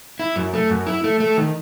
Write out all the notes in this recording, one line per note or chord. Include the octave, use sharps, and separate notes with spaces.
E4
F#2
A3
F#2
E4
A3
A3
D#3